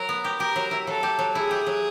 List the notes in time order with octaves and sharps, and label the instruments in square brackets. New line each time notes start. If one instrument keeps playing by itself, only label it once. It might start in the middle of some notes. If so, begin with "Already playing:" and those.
Already playing: [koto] F#3 [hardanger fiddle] A#4
[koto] B3
G4
[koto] G4 [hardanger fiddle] A#4
[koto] F#3
E4
[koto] F#3 [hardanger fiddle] A4
[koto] G4
F#3
[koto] E4 [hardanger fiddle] G#4
[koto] G4
F#3